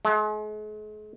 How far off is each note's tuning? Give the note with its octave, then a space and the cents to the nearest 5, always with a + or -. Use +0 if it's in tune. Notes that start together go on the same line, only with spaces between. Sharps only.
G#3 +40